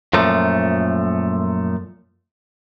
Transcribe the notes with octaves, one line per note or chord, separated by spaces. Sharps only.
F#2 A#2 F3 A3